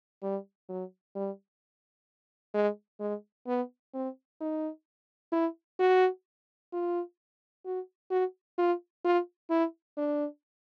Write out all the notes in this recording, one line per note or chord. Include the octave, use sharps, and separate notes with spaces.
G3
F#3
G3
G#3
G#3
B3
C4
D#4
E4
F#4
F4
F#4
F#4
F4
F4
E4
D4